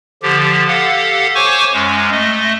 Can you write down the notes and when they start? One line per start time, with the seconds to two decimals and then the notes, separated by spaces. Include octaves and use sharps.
0.23 D3 F3 G4
0.67 G4 A4 F5 F#5
1.35 C5 C#5 G#5 C#6 D6
1.73 F#2 G#3 C#4
2.12 A3 D#5